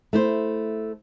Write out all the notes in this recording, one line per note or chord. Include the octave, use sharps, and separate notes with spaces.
A3 E4 C5